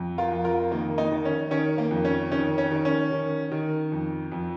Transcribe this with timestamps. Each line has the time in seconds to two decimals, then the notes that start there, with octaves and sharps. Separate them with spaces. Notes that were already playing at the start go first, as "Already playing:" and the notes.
Already playing: F2
0.18 F4 A#4
0.32 F2
0.44 F4 A#4
0.71 D#3 A#3
0.98 A#3 D#4
1.11 D#3
1.25 C#4
1.51 D#3 C#4
1.78 A#3
1.91 F2
2.05 C#4
2.32 D#3 C#4
2.58 C#4
2.71 D#3
2.85 C#4
3.11 D#3
3.52 D#3
3.92 F2
4.32 F2